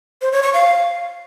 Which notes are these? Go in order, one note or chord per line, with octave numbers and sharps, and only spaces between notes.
C5
C#5
C#6
F5